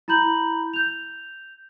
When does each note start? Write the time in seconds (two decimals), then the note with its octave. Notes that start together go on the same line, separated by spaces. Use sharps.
0.08 E4 A#5 B5 G6 F#7
0.74 G6 F7